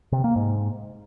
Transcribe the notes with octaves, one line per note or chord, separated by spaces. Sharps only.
C3
A#3
G#2